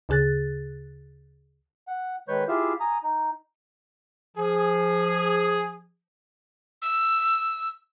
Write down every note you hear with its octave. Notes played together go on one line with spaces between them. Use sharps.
D2 C#3 G#4 F#6 A6
F#5
D#3 G#3 B4 C#5 C#6 G6
E4 F4 G4 G#4 E5 F5
G#5 A#5 D#6
D#4
F3 G#4
E6